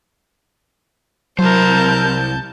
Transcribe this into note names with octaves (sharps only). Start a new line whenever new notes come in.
C2 F#3 E4 A#4 C5 A5 G6